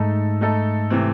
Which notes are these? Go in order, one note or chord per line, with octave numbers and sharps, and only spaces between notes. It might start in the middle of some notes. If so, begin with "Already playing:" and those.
Already playing: G#2 A3 D#4 A4
A3 D#4 A4
C3 E3 A3 C4